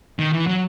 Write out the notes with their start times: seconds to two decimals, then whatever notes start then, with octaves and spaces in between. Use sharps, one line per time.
0.19 D#3
0.33 E3
0.47 F#3